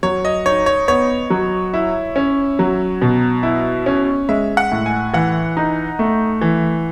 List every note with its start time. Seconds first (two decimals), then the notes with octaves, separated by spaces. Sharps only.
0.03 F#3 C#5
0.25 D#5
0.46 D#4 C#5
0.66 C#5
0.88 B3 C#5
1.30 F#3
1.74 E4
2.16 C#4
2.59 F#3
3.02 B2
3.43 E4
3.86 C#4
4.29 G#3 E5
4.57 F#5
4.71 A2
4.86 G#5
5.13 E3 F#5
5.57 D#4
5.99 A3
6.41 E3